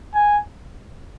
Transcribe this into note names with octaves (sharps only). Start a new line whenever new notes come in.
G#5